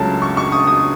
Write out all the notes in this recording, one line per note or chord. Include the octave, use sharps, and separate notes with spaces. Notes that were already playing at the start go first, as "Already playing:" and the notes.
Already playing: C#2 C#3 F#3 A3 C#4 A5
C#6
C#6
D#6
D#6